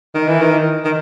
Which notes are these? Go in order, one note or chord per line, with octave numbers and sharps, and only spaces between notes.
D#3
E3
D#3
D#3